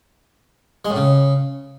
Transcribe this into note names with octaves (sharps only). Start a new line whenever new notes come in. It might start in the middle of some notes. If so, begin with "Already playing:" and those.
G#3
A2
C#3